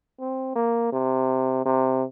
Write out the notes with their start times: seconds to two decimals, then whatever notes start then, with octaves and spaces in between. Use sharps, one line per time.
0.19 C4
0.56 A#3
0.92 C3
1.66 C3